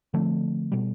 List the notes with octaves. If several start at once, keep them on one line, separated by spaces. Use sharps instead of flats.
D3 F3 A3 C4
B2 G3